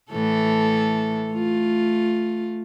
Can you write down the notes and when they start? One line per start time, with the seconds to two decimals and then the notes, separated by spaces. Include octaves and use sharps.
0.12 A2 E3 A4
1.30 A3 F4